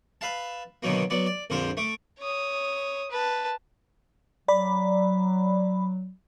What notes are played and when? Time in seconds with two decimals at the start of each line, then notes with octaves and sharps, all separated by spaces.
0.21 B4 E5 F5 A5
0.83 B2 D3 D#3 F#3 A#3
1.10 F#3 B3 D5
1.26 D5
1.50 A#1 F2 D3 A#4 C5
1.77 A3 D6
2.19 C#5 D#6
3.11 B4 A5
4.48 F#3 D5 B5